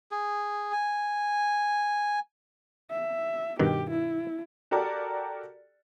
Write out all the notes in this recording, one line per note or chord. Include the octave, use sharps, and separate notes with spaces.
G#4
G#5
E5
G2 B2 D#3 G4
E4
F#4 G4 A4 A#4 D5